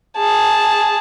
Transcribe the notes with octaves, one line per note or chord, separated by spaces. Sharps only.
G#4 A5